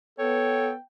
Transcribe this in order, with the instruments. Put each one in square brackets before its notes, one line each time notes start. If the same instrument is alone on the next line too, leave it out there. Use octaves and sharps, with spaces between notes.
[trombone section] B3 [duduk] A4 [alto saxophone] C#5 [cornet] G5